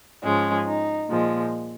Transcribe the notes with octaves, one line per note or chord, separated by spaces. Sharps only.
G#2 F3 G#3 C#4
D#4
A#2 F3 G#3